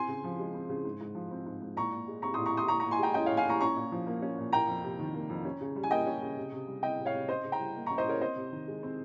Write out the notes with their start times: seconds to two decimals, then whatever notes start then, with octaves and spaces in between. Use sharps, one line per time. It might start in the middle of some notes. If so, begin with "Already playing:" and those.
Already playing: C4 G#5 C6
0.08 C#3
0.24 F3
0.39 G#3
0.54 C4
0.69 C#3
0.85 G#2
1.01 G#2
1.15 F3
1.31 C4
1.46 G#2
1.62 G#2
1.76 A#2 A#5 C#6
1.92 A#2
2.08 G#3
2.22 C4 A#5 C#6
2.34 A#2 C6 D#6
2.46 A#5 C#6
2.54 A#2 C6 D#6
2.68 A#2 A#5 C#6
2.80 A#2 A#5 C#6
2.91 G#5 C6
2.99 G#3 G5 A#5
3.14 C#4 D#5 G5
3.26 C#5 F5
3.31 A#2
3.37 F5 G#5
3.46 A#2 A#5 C#6
3.61 C#4 A#5 C#6
3.76 A#2
3.92 F3
4.07 A#3
4.22 C#4
4.38 A#2
4.52 A#3 G5 A#5
4.68 F2
4.83 C3
4.99 D#3
5.14 A#3
5.29 F2
5.45 C#4
5.61 C#3
5.76 G3
5.84 G#5
5.91 A#3 D#5 G5
6.06 C#4
6.22 C#3
6.36 C3
6.52 C3
6.68 G3
6.82 C4 D#5 G5
6.99 C3
7.05 C#5 F5
7.14 C3
7.28 C#4 C5 D#5
7.44 C#3
7.52 G5 A#5
7.60 G3
7.75 A#3
7.86 C#4 A#5 C#6
7.98 C5 D#5
8.06 C#3 A#4 C#5
8.20 C4 C5 D#5
8.36 C3
8.52 D#3
8.68 G#3
8.83 C4